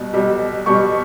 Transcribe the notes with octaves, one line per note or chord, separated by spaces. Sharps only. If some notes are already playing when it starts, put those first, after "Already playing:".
Already playing: B1 B2 G3
B1 B2 G3
B1 B2 G3 C#6